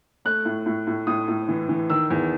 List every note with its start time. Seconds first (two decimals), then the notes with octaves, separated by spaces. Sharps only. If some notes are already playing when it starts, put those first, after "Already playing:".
0.25 A3 F#6
0.45 A2
0.66 A2
0.87 A2
1.07 A2 D#6
1.28 A2
1.48 E3
1.69 E3
1.90 D#3 E6
2.10 E2